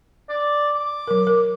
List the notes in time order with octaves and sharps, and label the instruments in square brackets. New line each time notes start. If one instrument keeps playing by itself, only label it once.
[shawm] D5
D6
[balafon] F#3 A#4
A#4